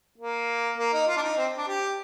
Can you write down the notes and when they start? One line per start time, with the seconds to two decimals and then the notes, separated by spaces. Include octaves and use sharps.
0.18 A#3
0.78 A#3
0.93 D#4
1.07 F4
1.17 D4
1.22 D#4
1.37 C4
1.57 D4
1.67 G4